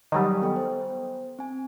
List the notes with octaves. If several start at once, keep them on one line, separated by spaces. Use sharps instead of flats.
D#3 F#3 G3 G4 G#5 D#6
B3 A4 G5
C5
C4 G#5